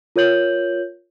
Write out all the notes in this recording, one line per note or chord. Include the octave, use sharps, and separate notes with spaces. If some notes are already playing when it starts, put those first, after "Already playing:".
F4 A#4 C#5 G6 F#7